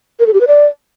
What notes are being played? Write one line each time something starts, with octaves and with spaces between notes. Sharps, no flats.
A#4
A4
G4
B4
D5